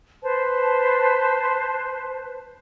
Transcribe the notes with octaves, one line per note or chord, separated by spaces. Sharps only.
B4 C5 A5